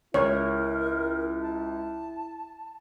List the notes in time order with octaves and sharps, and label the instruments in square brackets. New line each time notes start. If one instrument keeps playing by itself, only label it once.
[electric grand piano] C#2 [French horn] E4 [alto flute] A#4 [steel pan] C#5
[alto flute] A5